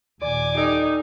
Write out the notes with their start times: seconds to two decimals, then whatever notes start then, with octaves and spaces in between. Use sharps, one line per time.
0.22 D#2 A#2 D5 G#5 D6
0.55 D#4 G4 A4